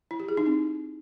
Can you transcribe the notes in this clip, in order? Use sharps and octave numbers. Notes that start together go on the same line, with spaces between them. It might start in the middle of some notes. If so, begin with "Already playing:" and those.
E4
G4
G#4
D#4
C4